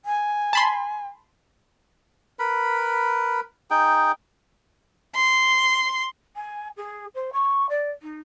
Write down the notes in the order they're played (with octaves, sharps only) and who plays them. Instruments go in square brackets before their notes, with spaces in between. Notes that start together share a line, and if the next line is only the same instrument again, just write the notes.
[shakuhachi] G#5
[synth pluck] A5 B5 C6
[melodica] A#4 B4 B5
D#4 G#4 G5
[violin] C6
[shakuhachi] G#5
G#4
C5
C#6
D5
D#4